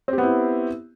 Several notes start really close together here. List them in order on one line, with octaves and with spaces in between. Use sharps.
C4 G4 B3 E4